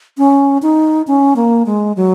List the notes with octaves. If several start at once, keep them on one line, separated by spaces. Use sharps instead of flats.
C#4
D#4
C#4
A#3
G#3
F#3